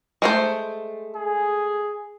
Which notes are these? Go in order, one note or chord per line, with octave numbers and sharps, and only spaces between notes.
G#3 A3 C5
G#4